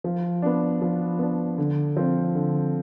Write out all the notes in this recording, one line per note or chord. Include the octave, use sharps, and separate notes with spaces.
F3
B3 D4
F3
B3 D4
D3
F3 C4
D3